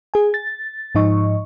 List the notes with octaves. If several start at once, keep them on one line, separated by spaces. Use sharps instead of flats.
G#4 G#5
A6
G#2 F3 D#4 D#5 C#6